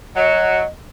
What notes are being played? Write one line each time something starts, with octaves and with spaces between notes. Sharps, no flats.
F#3 D#5